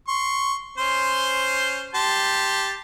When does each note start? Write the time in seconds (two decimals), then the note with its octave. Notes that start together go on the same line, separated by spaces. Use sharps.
0.08 C6 C#6
0.78 C#4 C5 C6
1.95 G4 A5 C6